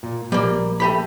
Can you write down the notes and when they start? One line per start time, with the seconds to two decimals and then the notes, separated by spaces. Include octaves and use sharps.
0.03 A#2
0.32 A#1 G3 A#3 A#4
0.80 A3 G4 B5